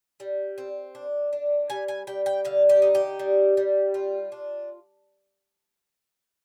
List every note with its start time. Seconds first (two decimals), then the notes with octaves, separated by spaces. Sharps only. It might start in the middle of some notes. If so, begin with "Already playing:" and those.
0.20 G3
0.58 C4
0.95 D4
1.33 D4
1.70 G3 G#5
1.88 G#5
2.07 G3 G5
2.26 G5
2.45 D3 F5
2.69 G4
2.82 D#4
2.95 G4
3.19 G3
3.57 G3
3.94 F4
4.32 D4